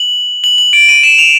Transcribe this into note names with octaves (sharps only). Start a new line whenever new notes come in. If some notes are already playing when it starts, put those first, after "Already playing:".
Already playing: F#7
F#7
F#7
D7
D#7
E7
F7